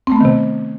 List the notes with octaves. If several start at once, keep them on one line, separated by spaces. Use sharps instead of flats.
C3 D#3 A3 B3 C4